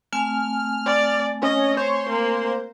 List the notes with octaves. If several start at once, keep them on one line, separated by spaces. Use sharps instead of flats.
A3 C4 G#5 F6
D5
C#4 D#5
C5 C#5
A#3